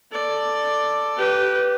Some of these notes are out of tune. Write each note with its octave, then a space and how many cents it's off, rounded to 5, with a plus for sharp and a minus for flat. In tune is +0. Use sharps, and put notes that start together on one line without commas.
A4 +5 D5 +5
G4 -20 B4 +0